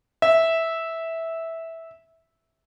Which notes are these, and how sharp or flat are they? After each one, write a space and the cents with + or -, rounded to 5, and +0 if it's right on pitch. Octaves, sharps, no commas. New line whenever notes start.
E5 -10